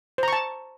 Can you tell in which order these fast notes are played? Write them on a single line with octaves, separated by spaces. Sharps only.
C5 A#5 C#6 A5